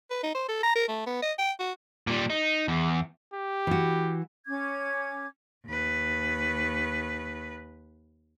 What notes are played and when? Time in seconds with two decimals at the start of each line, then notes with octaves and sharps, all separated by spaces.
0.11 B4
0.23 D#4
0.35 C5
0.49 A4
0.63 A#5
0.76 A#4
0.88 A3
1.07 B3
1.22 D#5
1.38 G5
1.59 F#4
2.07 A#2 G3
2.30 D#4
2.68 E2
3.34 G4
3.67 E3 F#4
4.47 C#4 D6 G#6
5.66 D#2 B4